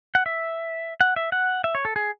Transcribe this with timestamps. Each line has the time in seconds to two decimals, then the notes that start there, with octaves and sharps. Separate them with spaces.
0.15 F#5
0.26 E5
1.01 F#5
1.16 E5
1.32 F#5
1.64 E5
1.75 C#5
1.85 A4
1.96 G#4